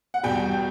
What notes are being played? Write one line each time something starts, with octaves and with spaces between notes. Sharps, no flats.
F#5
E2 B2 G3 G5